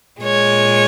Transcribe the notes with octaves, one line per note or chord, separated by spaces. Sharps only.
A#2 G#3 C#5